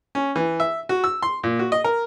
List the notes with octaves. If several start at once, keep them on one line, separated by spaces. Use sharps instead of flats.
C#4
E3
E5
F#4
E6
C6
A#2
F#4
D#5
A#4